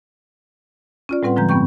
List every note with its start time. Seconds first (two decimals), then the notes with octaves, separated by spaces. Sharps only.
1.09 C#4 F4 D5
1.23 A2 G3 C4 B4 F#5 C6
1.36 D3 F3 G#3 A#5 G6
1.49 G2 B3 C4 G5 C#6 G6